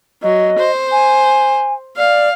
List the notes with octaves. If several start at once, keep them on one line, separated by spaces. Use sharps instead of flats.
F#3 D#5
C5
G#5
D5 F5